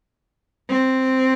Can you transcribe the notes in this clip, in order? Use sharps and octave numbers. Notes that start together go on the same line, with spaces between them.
C4